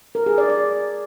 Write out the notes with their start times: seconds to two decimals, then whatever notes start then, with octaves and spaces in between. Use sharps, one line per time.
0.15 A#4
0.26 G#4
0.38 D5
0.49 D5